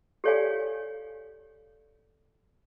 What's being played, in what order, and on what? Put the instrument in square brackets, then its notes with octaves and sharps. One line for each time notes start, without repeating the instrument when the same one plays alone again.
[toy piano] G4 A4 C#5 D5 F5 G#5